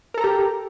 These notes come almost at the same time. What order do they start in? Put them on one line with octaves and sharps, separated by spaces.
A#4 A4 A#5 G4